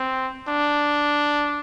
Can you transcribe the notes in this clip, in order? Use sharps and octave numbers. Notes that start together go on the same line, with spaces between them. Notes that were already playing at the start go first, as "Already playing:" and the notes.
Already playing: C4
D4